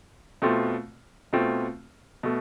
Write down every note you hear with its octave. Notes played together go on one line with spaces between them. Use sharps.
B2 A3 C4 F4
B2 A3 C4 F4
B2 A3